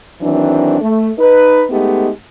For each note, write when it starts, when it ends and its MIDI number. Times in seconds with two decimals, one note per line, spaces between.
0.22 0.78 51
0.22 0.78 52
0.22 0.78 54
0.22 0.78 60
0.22 0.78 62
0.81 1.11 57
1.19 1.64 63
1.19 1.64 71
1.70 2.10 56
1.70 2.10 57
1.70 2.10 59
1.70 2.10 63
1.70 2.10 67